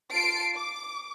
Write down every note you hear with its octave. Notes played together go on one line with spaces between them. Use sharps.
F4 A5 C7 D7
D6